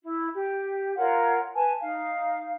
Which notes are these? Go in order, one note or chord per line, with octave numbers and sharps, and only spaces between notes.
E4
G4
F4 A#4 C#5 F#5
B4 G#5 A5
D#4 F5